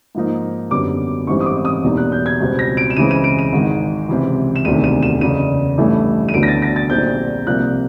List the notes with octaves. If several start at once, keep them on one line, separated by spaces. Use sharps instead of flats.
G#2 F3 A#3 D#4
F#2 D3 G3 B3 D6
A1 G#2 E3 G3 C4 C#6
D#6
D6
D#6
E2 B2 G3 A#3 D#4
F#6
G6
G#6
C#2 B2 G3 C4
A#6
D7
E7
C#2 C#3 E3 G#3 C4 D#7
D#7
D7
D#7
G#1 G#2 D#3 G#3
C#2 C3 E3
E7
E1 D2 C3 D#3 D#7
D#7
E7
F#1 E2 C#3 D#7
A1 G2 E3 A3
D#7
D2 D3 F#3 B3 D7
A#6
A6
A#6
A6
A#1 A#2 G3 C4 D#4 G6
C2 C3 F3 A#3 F#6